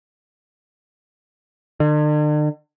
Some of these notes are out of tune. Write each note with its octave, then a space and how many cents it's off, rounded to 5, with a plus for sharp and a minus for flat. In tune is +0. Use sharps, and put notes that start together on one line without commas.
D3 +45